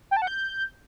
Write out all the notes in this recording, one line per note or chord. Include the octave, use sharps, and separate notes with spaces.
G5
A5
F#5
G6